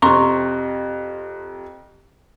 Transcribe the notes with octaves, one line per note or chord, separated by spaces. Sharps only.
F2 C3 A#5 C6 C#6